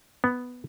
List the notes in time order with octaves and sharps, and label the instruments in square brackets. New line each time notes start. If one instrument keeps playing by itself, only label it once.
[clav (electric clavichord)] B3